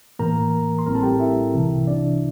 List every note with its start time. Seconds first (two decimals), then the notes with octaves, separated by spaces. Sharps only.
0.19 A2 E3 A#3 A#4 A#5
0.79 C6
0.86 A1 A2 G3 C4 A#4 A#5
0.95 A4 A5
1.03 G4 G5
1.20 E4 E5
1.54 C2 C3 E3
1.87 D4 D5